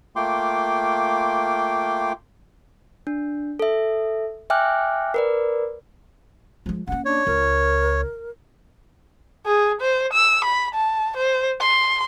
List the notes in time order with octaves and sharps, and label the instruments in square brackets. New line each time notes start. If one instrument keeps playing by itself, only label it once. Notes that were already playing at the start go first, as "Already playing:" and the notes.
[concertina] A3 A#3 F4 G5 C6 D6
[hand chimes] D4
A4 E5
E5 G5 G#5 D6 F6 F#6
A#4 B4 D5
[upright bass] F3 G#3
[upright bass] A#3 C#4 [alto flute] F#5
[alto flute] D4 [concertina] C#5
[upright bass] C#2 [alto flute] A#4
[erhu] G#4
C5
E6
B5
A5
C5
C6